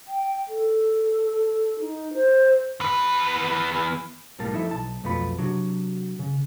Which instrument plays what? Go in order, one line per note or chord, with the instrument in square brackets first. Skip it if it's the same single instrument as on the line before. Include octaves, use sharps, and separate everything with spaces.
[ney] G5
A4
D#4
C5
[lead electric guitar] E2 B4
[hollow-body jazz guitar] B1 A2 G3 A#3 A5
F3 D#4 E4 A4 E5
B1 A5
B1 F2 A3 B3 F4 B5
C3 F#3 D4 F#4
C#3